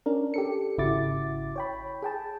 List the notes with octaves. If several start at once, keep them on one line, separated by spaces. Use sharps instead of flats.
C#4 D4 A#4
G4 A4 C#7
G#1 C#3 E4 F#4 D6 A6
C#5 G5 B5
G#4 G5 A5